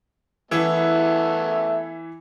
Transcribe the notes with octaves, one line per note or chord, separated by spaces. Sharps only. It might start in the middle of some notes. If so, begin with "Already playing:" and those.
E3 A3 B3 E4 E5